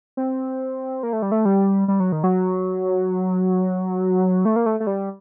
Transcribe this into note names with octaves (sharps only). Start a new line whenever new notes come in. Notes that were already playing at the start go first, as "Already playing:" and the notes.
C4
A#3
A3
G3
A3
G3
G3
F#3
D#3
F#3
A3
A#3
A3
A3
G3